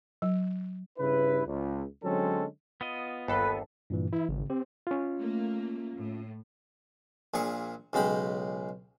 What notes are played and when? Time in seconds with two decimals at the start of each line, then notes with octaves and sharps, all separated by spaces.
0.22 F#3
0.99 G2 C#3 E4 B4
1.47 C#2
2.03 D3 F#3 G#3 C4 C#4 A4
2.81 B3 F4 D#5
3.28 G1 D#2 A4 B4
3.90 G2 A#2 E3
4.13 E3 E4
4.29 G#1 C#3
4.50 C4 G4
4.87 C#4 F4
5.20 A3 A#3
5.96 A2
7.34 A#1 A#2 G#4 C#6
7.93 B1 C#3 G#3 G5 B5